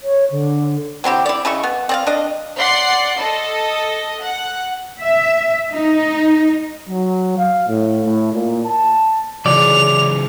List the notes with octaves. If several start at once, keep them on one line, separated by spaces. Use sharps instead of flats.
C#5
D3
F#3 C4 E4 G4
E4 D5
C#3 E4 D#5 C#6
B3
C4 D5 F5
D4 D#5
D5 F#5 C6 C7
A4 D#5
F#5
E5
D#4
F#3
F5
A2
A2
A#2
A5
C#3 E3 F#3 D5 F7